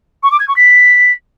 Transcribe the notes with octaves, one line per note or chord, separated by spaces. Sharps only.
C#6
D6
G#6
C#6
B6